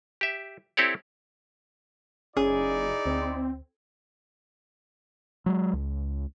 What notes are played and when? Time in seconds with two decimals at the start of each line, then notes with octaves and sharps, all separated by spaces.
0.21 G4 E5
0.77 C4 E4 G4 A4 C#5 D5
2.37 F#1 C#4 D#4 E4 G#4 D5
3.06 D2 C4
5.46 F#3 G#3
5.73 C#2